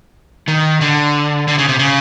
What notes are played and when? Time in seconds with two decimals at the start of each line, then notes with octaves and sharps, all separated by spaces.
0.48 D#3
0.81 D3
1.48 D3
1.59 C#3
1.69 C3
1.79 C#3